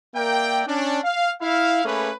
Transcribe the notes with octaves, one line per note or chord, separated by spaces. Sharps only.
A#3 A#4 D5 E5 G5
C#4 D4
F5
E4 F5
A3 A#3 C#4 G#4 B4